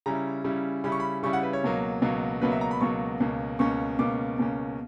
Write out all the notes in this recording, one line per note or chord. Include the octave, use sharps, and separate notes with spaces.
C#3 G3 C#4 E4 A#5
C#3 G3 C#4 E4
C#3 G3 C#4 E4 B5
C#6
B5
C#3 G3 C#4 E4 C#6
F#5
B4
C#5
C#2 B2 F#3 A#3
C#2 B2 F#3 A#3
C#2 B2 F#3 A#3 B4
E5
A#5
B5
C#2 B2 F#3 A#3 C#6
C#2 B2 A#3 C#4
C#2 B2 A#3 C#4 C#6
C#2 B2 A#3 C#4 D6
C#2 B2 A#3 C#4